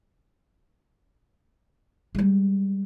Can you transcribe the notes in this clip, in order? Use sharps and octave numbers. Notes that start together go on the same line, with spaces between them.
G3 G#3